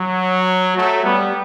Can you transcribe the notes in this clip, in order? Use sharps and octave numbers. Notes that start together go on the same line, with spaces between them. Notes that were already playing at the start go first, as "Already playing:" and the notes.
Already playing: F#3
F#3 A3
G3 B3